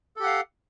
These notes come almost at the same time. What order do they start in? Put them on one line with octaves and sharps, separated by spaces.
A4 G4 F#5 F5